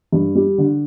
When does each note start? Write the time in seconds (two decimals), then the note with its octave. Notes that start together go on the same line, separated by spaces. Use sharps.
0.12 G2
0.35 G3
0.58 D3